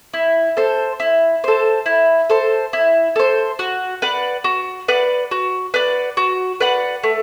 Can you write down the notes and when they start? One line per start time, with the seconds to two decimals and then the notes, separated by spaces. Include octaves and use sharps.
0.14 E4
0.57 A4 C5
1.00 E4
1.44 A4 C5
1.86 E4
2.30 A4 C5
2.73 E4
3.16 A4 C5
3.59 F#4
4.02 B4 D5 F#5
4.44 F#4
4.88 B4 D5 F#5
5.31 F#4
5.74 B4 D5 F#5
6.17 F#4
6.61 B4 D5 F#5
7.03 A3